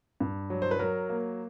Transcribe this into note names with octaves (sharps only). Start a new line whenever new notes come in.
G2
F#3
C5
B4
F#3 A#4
A#3